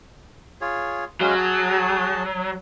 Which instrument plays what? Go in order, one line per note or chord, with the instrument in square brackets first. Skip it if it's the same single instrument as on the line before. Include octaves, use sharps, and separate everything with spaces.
[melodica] F4 G#4 C#5
[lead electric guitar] F#3 [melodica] G#3 C#4 F5
[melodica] G#4 A5